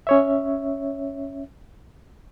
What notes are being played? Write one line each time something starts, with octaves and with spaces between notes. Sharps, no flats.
C#4 C#5 E5